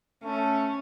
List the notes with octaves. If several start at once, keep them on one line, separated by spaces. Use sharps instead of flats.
A3 C#4